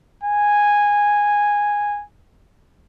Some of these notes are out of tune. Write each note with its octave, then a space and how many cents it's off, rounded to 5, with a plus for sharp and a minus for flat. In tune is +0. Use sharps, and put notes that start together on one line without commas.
G#5 -10